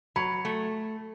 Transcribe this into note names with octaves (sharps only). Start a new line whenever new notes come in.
F#3 B5
A3